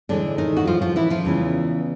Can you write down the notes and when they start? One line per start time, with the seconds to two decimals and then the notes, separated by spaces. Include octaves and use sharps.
0.09 A2 D3 E3 G#3 D4
0.38 D#3 D#4
0.57 F#4
0.67 F3 F4
0.82 F3 F4
0.96 E3 E4
1.10 F3 F4
1.25 E2 C#3 E3 G#3